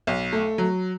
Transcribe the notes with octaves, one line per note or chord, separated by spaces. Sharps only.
B1
A3
F#3